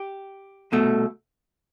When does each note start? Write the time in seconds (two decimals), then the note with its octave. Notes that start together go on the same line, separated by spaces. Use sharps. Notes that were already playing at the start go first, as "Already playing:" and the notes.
Already playing: G4
0.72 C2 B2 A3